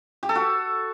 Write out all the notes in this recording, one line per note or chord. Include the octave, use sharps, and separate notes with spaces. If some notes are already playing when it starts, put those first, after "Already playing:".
G4
A4
F#4